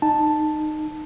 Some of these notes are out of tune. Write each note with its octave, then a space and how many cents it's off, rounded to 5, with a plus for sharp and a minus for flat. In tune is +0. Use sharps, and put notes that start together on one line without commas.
D#4 -20 A5 +0